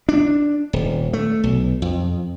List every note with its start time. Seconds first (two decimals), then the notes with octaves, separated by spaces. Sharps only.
0.09 D4
0.73 D#1
1.13 A3
1.44 B1
1.82 F2